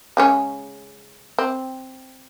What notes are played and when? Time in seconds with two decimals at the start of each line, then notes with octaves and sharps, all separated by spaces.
0.17 C#3 G#3 C#4
1.39 C4